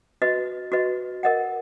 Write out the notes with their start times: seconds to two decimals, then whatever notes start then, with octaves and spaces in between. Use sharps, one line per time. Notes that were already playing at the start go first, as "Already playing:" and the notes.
0.22 F#4 B4 D#5
0.72 F#4 B4 D#5
1.23 A#4 D#5 F#5